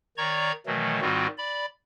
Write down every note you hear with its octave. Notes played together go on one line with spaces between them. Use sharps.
D#3 C#5 D5 A#5 C#6 G#6
B2 D#3 E3 F#3 A3
G#2 D#3 G3 C4 F4 F#4
D5 B5